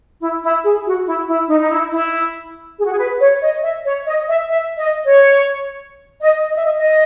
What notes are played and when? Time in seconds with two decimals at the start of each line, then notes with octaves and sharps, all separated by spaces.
0.21 E4
0.42 E4
0.64 G#4
0.86 F#4
1.06 E4
1.28 E4
1.49 D#4
1.59 D#4
1.70 E4
1.92 E4
2.78 G#4
2.85 F#4
2.92 G#4
2.98 B4
3.20 C#5
3.41 D#5
3.63 E5
3.85 C#5
4.06 D#5
4.28 E5
4.49 E5
4.77 D#5
5.06 C#5
6.21 D#5
6.49 D#5
6.57 E5
6.64 D#5
6.78 D#5